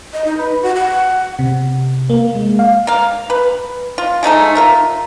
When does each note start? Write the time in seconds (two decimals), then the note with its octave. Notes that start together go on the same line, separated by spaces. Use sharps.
0.13 D#5
0.25 D#4
0.37 B4
0.63 F#4
0.76 F#5
1.39 C3
2.10 A#3
2.35 G#3
2.59 F5
2.87 A#3 F5
3.30 B4
3.98 F4
4.23 G#3 A3 D#4 A4
4.55 F4 A#4 E5